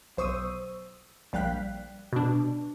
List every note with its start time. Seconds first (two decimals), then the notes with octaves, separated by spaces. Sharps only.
0.17 B1 C5 C#6 D#6 E6 D#7
1.33 A#1 G3 F5 G5 F#6 B6
2.13 B2 D4